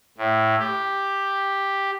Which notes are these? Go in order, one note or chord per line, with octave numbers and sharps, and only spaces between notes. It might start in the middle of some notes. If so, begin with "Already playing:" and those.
A2
G4